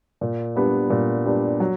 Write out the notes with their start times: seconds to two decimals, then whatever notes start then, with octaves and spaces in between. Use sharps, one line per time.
0.21 A#2
0.56 G3 B3 D4 G4
0.90 A#2
1.25 G3 B3 D4 G4
1.60 F#3